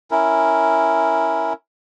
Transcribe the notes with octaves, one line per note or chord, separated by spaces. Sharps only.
C#4 E4 A#4